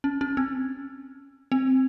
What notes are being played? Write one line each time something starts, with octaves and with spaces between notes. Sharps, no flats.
C#4
C#4
C4
C4